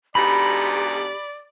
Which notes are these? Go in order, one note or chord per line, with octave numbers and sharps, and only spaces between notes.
D2 G#2 B2 G4 D5 B5